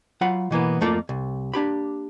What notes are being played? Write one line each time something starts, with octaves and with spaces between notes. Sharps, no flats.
F#3 F4 F5 F#5 B5
B2 E3 A#3 B3
F2 A3 A#3 F4 D5
C2
A#3 D4 G4 B5